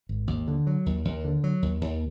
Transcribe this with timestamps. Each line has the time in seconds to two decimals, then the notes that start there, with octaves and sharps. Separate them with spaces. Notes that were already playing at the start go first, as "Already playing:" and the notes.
0.09 G#1
0.27 D#2
0.47 D3
0.67 F#3
0.86 D#2
1.05 D#2
1.24 D3
1.44 F#3
1.62 D#2
1.81 D#2